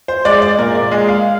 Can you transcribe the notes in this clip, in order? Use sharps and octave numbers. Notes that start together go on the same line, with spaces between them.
C5
G#3 D5
D5
A#2 A#4
D5
G#3
F5